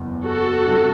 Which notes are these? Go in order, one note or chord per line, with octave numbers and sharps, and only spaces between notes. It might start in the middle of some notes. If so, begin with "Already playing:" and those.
Already playing: F#1 E2
F#4 A4
D2 C3 G3